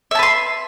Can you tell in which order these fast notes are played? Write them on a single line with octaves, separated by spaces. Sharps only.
E5 A5 B4 C6